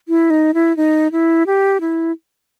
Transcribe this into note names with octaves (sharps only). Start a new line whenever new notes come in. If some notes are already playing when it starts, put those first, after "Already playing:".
E4
D#4
E4
D#4
E4
G4
E4